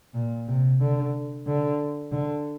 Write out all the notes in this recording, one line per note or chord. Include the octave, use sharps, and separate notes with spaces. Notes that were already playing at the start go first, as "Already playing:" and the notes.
A#2
C3
D3
D3
D3